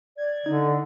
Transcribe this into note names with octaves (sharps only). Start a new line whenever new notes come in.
D5 G#6
D3 D#4